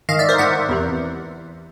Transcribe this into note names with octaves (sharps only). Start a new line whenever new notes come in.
G#2 D#3 D#5 F5
D5 E5
A#4 C5
G#2 D#3 E5 F#5
E2 C3 E3